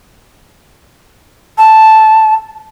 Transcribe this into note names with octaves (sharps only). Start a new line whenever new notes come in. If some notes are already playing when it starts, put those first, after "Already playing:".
A5